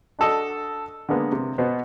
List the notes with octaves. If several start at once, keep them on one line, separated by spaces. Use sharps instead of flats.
D4 F#4 A4 D#5
D3 G#3 A#3 B3
C3
B2 B3 C5